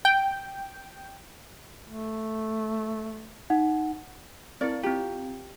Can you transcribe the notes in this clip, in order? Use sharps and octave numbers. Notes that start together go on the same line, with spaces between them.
G5
A3
D#4 F#5
C4 E4 A#4 D5
C4 F4 G4